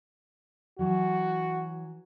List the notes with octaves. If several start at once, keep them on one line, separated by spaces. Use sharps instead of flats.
E3 F#3 F#4